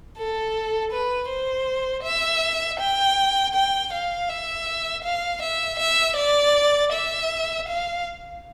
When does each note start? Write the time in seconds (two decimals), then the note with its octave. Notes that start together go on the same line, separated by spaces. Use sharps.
0.17 A4
0.92 B4
1.29 C5
2.04 E5
2.80 G5
3.54 G5
3.93 F5
4.29 E5
5.04 F5
5.42 E5
5.79 E5
6.17 D5
6.92 E5
7.68 F5